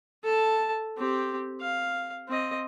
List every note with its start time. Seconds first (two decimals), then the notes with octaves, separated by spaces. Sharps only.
0.24 A4 A5
0.98 C4 G4
1.61 F5
2.29 C4 D#5